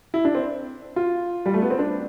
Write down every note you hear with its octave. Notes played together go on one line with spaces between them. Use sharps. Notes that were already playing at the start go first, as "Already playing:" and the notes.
E4
D4
C4
F4
G3
A3
B3
C4
D4